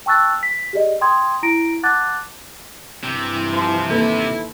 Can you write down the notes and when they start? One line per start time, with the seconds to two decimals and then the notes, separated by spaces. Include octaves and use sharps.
0.06 G5 A5 C#6 E6 F#6 A6
0.43 B6
0.73 G4 G#4 D5 D#5
1.01 G5 C6 D#6 G#6
1.43 E4 A#5 A#6 D7
1.83 F#5 A5 D6 F#6 A6
3.03 G2 C3 E3 G4
3.53 F3
3.90 D#2 E4 A4 B4